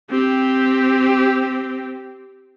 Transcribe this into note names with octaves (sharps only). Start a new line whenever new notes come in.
C4 G4